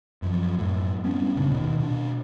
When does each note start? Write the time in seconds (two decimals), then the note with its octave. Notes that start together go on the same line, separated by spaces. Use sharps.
0.22 F#2 F3
0.58 F#2 A2
1.04 G3 B3 C#4 D4
1.36 F#1 A#2 C#3 D4
1.49 D#2 B2 D#3
1.79 B2 D4